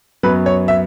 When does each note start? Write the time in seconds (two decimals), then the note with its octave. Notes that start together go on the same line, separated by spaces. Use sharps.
0.23 F#2 F#3 B3 B4
0.46 C#5
0.68 E5